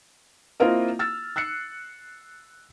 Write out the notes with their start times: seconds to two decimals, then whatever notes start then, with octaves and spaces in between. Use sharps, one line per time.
0.60 A#3 C4 E4 F4 A#4 D#5
0.99 E6 F6 A6
1.36 E6 F#6 C7 C#7